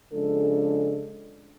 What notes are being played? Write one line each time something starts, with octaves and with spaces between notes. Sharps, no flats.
C#3 F3 G#3 D4 A4